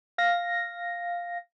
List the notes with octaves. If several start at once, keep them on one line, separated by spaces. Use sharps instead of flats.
F5 A#6